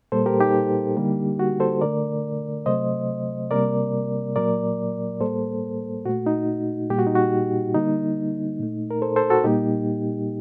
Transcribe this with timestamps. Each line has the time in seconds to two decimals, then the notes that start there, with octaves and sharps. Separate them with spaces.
0.12 A#2 G3 A#3 A4 C5
0.26 G4 A#4
0.40 D#4 G4
0.97 D3 G3 A#3
1.39 F#4
1.60 A4 C5
1.81 D3 A3 A#4 D5
2.66 C3 F#3 A3 C5 D#5
3.51 C3 G3 A#3 A#4 D5
4.36 A#2 F#3 A#3 A#4 D5
5.20 A2 G3 A#3 A4 C5
6.05 A#2 A3 F#4
6.26 D#4
6.90 A#2 G3 A#3 G4
6.99 F#4
7.07 D#4
7.15 F#4
7.74 D3 G3 A#3 D#4
8.60 A#2 A3
8.91 A#4
9.02 A4 C5
9.16 A4 C5
9.30 F#4 A4
9.44 A#2 G3 A#3 D#4 G4